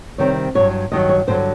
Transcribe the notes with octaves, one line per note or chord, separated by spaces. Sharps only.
C3 D#3 G3 C4 C#5
G2 D#3 F#3 C#5
G2 D#3 F#3 D#5
C#5
G2 D3 F#3 C5